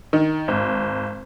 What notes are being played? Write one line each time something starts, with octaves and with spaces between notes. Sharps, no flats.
D#3
G#1